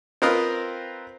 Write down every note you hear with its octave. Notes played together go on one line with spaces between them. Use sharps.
C4 F4 A#4 B4 D#5 F5